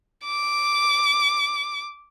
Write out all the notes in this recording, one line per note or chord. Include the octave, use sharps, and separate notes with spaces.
D6